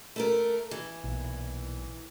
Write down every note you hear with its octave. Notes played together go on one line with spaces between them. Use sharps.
A3 A4 A#4
E3
B1 A#2